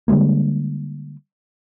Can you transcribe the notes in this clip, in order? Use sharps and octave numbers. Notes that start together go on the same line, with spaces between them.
D3 G3 G#3 A#3